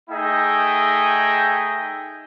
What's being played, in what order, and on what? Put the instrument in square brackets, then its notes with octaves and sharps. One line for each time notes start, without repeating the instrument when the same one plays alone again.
[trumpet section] A3 D#4 G#4 D#5 E5 G5